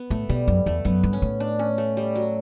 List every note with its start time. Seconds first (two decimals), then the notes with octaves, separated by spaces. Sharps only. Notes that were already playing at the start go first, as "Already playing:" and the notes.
Already playing: B3
0.10 A2 A3
0.29 B2 G3
0.47 F#2
0.66 E2 A3
0.85 F#2 B3
1.03 G2
1.13 C#4
1.22 A2
1.40 D4
1.59 C#4
1.78 A3
1.97 G3
2.15 F#3